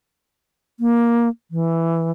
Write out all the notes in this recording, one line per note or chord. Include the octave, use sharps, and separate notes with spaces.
A#3
E3